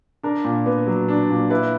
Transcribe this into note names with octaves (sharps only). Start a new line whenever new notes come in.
D4 A#4
A#2
B3
F#3
D4
A#2
E4 B4